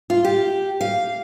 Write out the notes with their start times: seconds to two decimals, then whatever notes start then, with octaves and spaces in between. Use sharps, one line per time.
0.10 F4
0.24 G4
0.81 F5